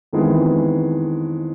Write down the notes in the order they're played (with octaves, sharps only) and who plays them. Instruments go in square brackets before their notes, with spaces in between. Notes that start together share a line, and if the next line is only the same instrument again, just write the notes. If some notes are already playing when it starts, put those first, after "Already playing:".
[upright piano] F2 D#3 E3 G#3 B3